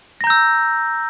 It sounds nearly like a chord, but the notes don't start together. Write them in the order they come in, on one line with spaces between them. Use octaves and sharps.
A#6 A#5 G6 E6